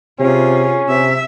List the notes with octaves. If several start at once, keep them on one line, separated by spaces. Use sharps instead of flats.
C3 C#4 F4 G#4
C3 E5